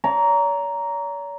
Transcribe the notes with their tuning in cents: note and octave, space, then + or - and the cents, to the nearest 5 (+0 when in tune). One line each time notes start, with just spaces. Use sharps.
C#5 +45 A#5 +0